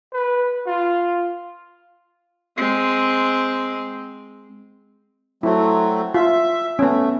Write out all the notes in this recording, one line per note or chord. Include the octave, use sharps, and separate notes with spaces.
B4
F4
G#3 C4
F#3 A3 C4 E4
F4 E5
A3 B3 C#4